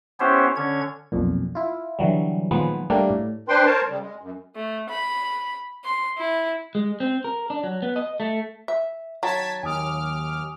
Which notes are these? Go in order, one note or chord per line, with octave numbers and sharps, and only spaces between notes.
B3 C#4 E4 G4 C5 C#5
D3 C#4 C#5 G#6
B1 F2 A#2
E4 F4
D3 E3 F#3 G3
A#2 D#3 F3 F#3 G#3 B3
G3 A3 A#3 D4
A2
D4 B4 C5 G5 C6
A#4 C5 C#5 A5
C#3 G3
G#3
F#2
A3
B5
C6
E4
G#3
C4
A#4
D4
F#3
B3
D#5
A3
E5
D#3 F#3 A5 G#6 B6
D#2 G#5 D6 D#6 F6